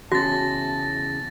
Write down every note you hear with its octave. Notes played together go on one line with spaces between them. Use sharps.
E2 C#3 C#4 F#4 A5 A6 A#6